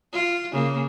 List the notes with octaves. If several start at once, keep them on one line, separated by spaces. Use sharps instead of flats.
F4
C#3 A#3